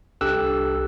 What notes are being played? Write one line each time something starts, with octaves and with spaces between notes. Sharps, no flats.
C2 D4 G4 A4 E6 F#6